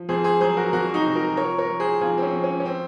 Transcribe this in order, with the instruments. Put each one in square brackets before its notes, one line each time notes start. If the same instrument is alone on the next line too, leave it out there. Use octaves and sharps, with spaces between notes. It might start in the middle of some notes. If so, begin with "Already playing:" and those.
Already playing: [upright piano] F3
F2 G#4 C5
G#4 C5
F#3 G#4 C5
F#4 A#4
F2 F#4 A#4
D#4 F#4
C3
F#4 A#4
F3 A#4 C#5
A#4 C#5
F3
G#4 C5
F2 F4 G#4
C4
C#4
F2
C#4
C#4
C4